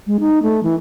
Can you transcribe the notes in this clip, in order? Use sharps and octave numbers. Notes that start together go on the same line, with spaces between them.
G#3
D#4
A3
E3